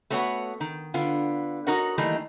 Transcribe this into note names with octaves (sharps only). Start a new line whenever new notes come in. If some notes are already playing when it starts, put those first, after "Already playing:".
A3 B3 F#4 C#5 F#5
D#3
D3 B3 F4
D#4 F#4 A#4 C#5 F#5
D#3 E3 G3 A3 A#3 D#4